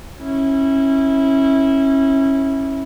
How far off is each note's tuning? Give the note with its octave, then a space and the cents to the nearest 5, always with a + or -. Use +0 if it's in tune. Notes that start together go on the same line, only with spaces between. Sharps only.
C#4 -25 E4 -20